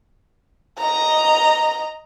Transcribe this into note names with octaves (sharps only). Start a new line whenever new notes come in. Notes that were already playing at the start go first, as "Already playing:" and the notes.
D#5 A#5